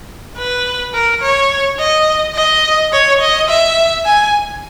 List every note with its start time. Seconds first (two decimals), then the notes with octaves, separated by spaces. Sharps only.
0.38 B4
0.94 A#4
1.22 C#5
1.79 D#5
2.35 D#5
2.93 C#5
3.21 D#5
3.49 E5
4.06 G#5